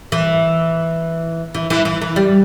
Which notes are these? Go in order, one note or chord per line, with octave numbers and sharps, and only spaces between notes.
E3
E3
E3
E3
E3
G3